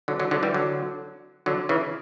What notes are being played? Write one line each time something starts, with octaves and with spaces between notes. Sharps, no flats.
D3 F#3
D3 F#3
D3 F#3
E3 G3
D3 F#3
D3 F#3
C#3 E3